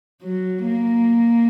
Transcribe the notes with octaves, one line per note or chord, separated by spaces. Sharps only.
F#3
A#3